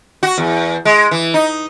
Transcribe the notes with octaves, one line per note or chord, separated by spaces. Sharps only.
F#4
E2
G#3
E3
D#4